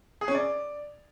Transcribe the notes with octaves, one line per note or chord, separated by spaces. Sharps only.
G#4
C#4
D5